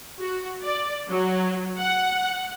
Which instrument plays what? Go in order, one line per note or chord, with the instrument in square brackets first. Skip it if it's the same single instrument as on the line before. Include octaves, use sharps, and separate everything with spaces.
[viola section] F#4
D5
F#3
F#5